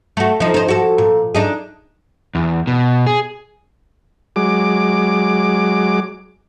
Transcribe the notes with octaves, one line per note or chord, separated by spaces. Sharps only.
A3 F#4
F3 D#4
D#4 C5
F#4 A4
A#2
D4 D#4 G#4
E2
B2
G#4
F#3 G#3 D6